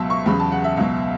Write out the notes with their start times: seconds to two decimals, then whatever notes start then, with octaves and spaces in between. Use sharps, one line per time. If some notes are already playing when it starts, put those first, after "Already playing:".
Already playing: C#2 B2 F#3 E5 A5
0.10 C#6
0.26 E2 C#3 F#3 B5
0.40 A5
0.52 F#5
0.64 E5
0.77 C#2 B2 F#3